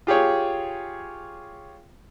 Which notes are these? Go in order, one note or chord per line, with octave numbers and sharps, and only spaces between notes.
F4 G4 G#4 C#5